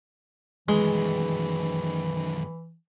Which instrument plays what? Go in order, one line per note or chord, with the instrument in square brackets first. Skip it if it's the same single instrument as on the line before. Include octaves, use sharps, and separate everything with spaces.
[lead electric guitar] F#2 D#3 [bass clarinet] E3 [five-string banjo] G#3